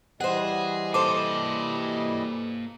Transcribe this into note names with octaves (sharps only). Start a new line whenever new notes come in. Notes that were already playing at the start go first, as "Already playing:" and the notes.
E3 G3 G#4 C5 D#5 F#5
A#3 A4 C5 G#5 D6